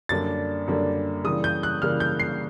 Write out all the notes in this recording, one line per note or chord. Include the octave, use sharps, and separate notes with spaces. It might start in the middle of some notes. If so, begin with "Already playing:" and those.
F#2 D3 G3 A#3 D4 A6
F#2 D3 G3 A#3 D4
C#3 E3 G3 A#3 D#6
G6
F#6
C#3 E3 G3 A#3 F6
G6
C7